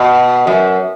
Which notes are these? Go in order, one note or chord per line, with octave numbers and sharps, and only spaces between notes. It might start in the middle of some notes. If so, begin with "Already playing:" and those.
Already playing: B2
F#2